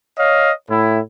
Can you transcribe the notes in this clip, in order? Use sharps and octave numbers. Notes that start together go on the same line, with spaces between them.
C#5 D#5 F5
A2 E4